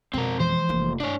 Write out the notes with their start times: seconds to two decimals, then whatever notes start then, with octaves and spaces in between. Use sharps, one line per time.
0.14 F2 B2 C4 A#4
0.40 E3 F3 G#3 C5
0.69 F1 A#3
1.00 G2 D4 C#5